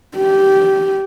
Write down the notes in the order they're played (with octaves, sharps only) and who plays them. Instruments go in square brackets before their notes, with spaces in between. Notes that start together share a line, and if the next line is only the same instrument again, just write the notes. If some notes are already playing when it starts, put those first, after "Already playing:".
[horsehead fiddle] G4